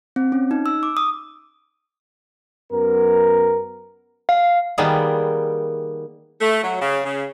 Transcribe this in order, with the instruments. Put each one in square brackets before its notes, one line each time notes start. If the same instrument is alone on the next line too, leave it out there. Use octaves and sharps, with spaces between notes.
[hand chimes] C4
C#4
D#4
E6
D6
D#6
[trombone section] F#2 B3 A#4
[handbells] F5
[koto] D#3 G3 A#3 B3 G#4
[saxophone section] A3
F#3
C#3
C#3